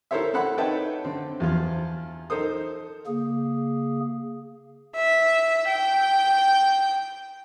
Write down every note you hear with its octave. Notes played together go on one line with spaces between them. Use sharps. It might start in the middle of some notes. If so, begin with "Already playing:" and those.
E4 A4 A#4 C5 C#5 E5
C4 A4 C#5 F#5 B5
D#4 B4 C#5 E5 G5 A5
D3 C4
E2 F3 F4
D#4 A4 A#4 C5 D#6
C#3 A#3 G#4
E5
G5